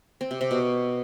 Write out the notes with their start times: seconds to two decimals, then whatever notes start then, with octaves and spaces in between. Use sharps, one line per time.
0.21 C4
0.31 C3
0.41 C3
0.51 B2